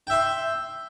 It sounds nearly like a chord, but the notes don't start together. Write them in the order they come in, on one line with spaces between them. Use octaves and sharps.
G5 E5 C6